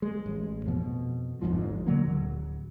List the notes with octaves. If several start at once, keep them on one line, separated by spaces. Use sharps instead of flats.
G#3
A1
F2 B2
G1 F2 G#2 F3
A#2 D3 F#3 A#3
D1